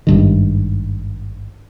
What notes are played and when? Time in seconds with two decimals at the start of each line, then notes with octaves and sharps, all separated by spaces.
0.07 G#1 G2 D#3